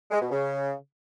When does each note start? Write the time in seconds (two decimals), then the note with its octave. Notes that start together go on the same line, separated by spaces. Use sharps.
0.11 G#3
0.21 B2
0.31 C#3